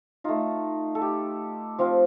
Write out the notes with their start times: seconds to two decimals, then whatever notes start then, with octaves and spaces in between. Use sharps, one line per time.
0.24 A3 D#4 F4
0.95 A4
1.02 G4
1.79 F3 C4 F4